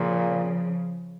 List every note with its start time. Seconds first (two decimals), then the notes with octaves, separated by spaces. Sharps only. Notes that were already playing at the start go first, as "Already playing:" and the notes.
Already playing: A#2 C#3 F3